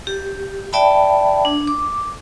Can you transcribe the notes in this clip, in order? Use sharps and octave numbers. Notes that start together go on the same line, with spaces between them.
G4
D5 E5 G5 A5 B5
D4
D6